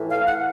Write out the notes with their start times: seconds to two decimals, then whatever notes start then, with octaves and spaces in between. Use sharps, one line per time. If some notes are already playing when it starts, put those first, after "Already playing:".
Already playing: A2 E3
0.10 F5
0.27 F#5